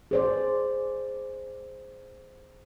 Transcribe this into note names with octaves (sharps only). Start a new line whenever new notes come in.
G#4 C5 D5